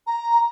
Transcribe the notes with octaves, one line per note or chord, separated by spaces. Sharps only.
A#5